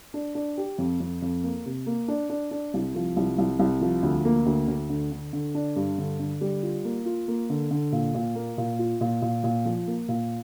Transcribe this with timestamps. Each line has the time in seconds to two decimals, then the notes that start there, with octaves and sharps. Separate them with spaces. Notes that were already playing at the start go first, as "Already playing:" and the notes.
0.14 D4
0.35 D4
0.57 G4
0.78 F2
1.00 F2
1.22 F2
1.43 A#3
1.66 C3
1.86 A#3
2.08 D4
2.30 D4
2.51 D4
2.74 C2
2.95 F3
3.17 C2
3.38 C2
3.59 C2
3.81 F3
4.03 D2
4.25 A#3
4.46 D2
4.68 D2
4.89 D3
5.11 D3
5.33 D3
5.55 D4
5.76 G2
5.98 D3
6.19 D3
6.41 G3
6.63 F4
6.85 A#3
7.06 F4
7.28 A#3
7.50 D3
7.71 D3
7.92 A#2
8.14 A#2
8.35 A#3
8.58 A#2
8.79 F4
9.01 A#2
9.22 A#2
9.44 A#2
9.65 F3
9.87 A#3
10.08 A#2